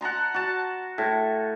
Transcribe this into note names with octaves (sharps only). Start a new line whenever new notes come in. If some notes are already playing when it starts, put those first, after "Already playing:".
F#5 A5 A#5 C6
F#4 A5
A2